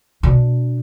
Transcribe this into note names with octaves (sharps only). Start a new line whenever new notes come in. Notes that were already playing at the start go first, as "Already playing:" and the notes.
B2 D4